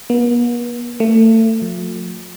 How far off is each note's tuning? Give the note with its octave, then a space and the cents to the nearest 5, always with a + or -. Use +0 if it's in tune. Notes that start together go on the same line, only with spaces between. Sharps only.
B3 -45
A3 +30
F3 +45